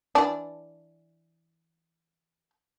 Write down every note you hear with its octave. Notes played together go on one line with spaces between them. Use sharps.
E3 D4